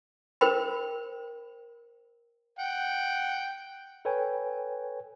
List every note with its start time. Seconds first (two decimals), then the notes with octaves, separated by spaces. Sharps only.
0.41 A#4 C5 G5 B5
2.59 F#5 G5
4.05 A4 B4 C#5 G5 G#5